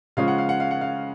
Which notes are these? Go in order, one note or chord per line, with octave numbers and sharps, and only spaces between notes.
C#3 F3 G#3 C#4 F5
F#5
F5
F#5
F5
F#5
F5